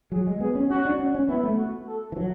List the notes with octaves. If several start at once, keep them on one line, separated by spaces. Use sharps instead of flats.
F#3 G#4
G#3
B3 G#4
C#4
C#4 F#4
D4
C#4
C#4
B3 E4
A3
F#4
A4
E3
F#3